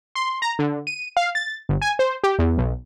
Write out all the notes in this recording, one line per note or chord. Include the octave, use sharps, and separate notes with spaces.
C6
A#5
D3
D#7
F5
A6
G1
G#5
C5
G4
E2
B1